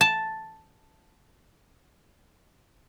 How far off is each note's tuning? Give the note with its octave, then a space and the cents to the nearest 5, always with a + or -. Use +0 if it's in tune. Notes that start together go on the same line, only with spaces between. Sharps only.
A5 +0